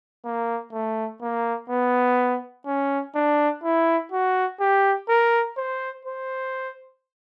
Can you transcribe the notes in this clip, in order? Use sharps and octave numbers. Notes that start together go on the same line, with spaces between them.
A#3
A3
A#3
B3
C#4
D4
E4
F#4
G4
A#4
C5
C5